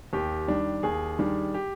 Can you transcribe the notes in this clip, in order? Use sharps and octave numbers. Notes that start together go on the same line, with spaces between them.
D#2 G4
D#3 G3 D4
D#2 G#4
D#3 G3 D4
G4